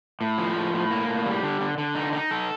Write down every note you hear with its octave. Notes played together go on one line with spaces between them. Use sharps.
A2
F3
A2
A2
A#3
A2
G3
D3
D3
D3
D#4
D#4
A4